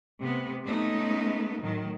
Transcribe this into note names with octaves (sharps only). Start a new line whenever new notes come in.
C3 A3 B3
G#3 A3 B3 C#4 D#4
A2 D#3 F#3